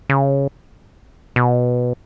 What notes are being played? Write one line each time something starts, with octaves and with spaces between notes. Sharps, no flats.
C#3
B2